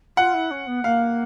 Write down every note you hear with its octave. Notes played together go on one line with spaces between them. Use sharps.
F4 F#5
E4
C#4
B3
A#3 F5